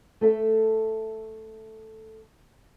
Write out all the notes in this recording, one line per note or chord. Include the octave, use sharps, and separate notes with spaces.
A3 A4 E5